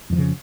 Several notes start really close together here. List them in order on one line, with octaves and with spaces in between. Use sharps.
F2 E3 F3 C#3